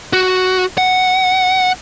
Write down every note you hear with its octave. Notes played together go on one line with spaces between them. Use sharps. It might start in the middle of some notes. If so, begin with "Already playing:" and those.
F#4
F#5